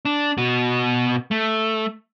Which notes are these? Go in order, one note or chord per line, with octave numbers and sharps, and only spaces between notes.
D4
B2 F#4
A3